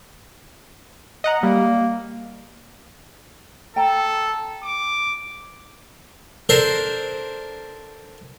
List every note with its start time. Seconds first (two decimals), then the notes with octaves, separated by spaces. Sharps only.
1.24 D#5 F#5 A#5
1.43 G3 A#3
3.76 A4 G5 A#5
4.63 D6
6.49 D4 A4 A#4 C5